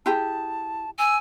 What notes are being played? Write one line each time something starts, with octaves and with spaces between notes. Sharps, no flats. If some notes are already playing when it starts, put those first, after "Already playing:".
E4 G4 G#4 A5
G#5 E6